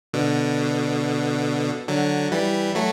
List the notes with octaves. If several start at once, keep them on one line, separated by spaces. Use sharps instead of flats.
B2 D3
D3 F#3
E3 G3
F#3 A3